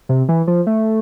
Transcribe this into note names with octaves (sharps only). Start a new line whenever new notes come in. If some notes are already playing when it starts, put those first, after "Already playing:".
C3
E3
F3
A3